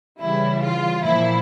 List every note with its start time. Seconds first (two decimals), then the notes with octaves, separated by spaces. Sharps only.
0.20 C#3 E3 G3 E4
0.63 F4
1.04 A#2 F3 E4